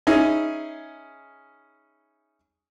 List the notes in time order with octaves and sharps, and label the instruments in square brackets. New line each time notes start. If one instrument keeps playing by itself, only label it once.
[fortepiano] C#4 D#4 E4 G#4